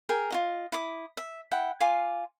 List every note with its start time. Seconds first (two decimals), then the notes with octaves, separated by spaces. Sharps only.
0.09 G#4 A#4 G5
0.30 F4 F#4 D#5
0.72 E4 D6 D#6
1.17 E5
1.51 E4 F#5 G5
1.80 F4 F5 G#5 D6